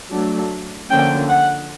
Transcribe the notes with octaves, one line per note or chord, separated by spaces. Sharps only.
F#3 A3 D4
D3 F3 A#3 C#4 G5
F#5